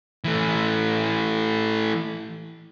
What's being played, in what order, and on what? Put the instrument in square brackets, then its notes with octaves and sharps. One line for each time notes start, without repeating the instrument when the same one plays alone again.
[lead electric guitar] E3 A3